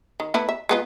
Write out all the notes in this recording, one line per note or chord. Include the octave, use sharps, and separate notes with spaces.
D#3
A3 B3 E4
E5
G#3 B3 F4